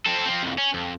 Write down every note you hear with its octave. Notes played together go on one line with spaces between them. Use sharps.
C4 A4
F3 C4
C2 F2
C#4
F2